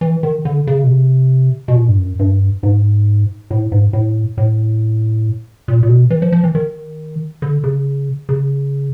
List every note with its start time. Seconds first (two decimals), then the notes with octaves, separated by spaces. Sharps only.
0.01 E3
0.23 D#3
0.45 D3
0.67 C#3
0.84 B2
0.89 C3
1.68 B2
1.76 A#2
1.88 G2
1.98 F#2
2.19 G2
2.63 G#2
3.50 A2
3.72 G#2
3.93 A2
4.37 A2
5.68 A#2
5.83 A#2
5.89 B2
6.10 E3
6.22 F3
6.32 F3
6.44 E3
6.55 D#3
7.42 D3
7.64 C#3
8.29 C#3